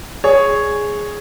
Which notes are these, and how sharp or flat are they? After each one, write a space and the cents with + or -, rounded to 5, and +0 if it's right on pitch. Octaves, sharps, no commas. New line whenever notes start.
G#4 +0 C#5 +0